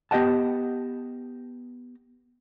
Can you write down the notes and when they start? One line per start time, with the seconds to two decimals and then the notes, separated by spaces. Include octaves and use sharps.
0.11 B3 G4 D#5 F#5 A5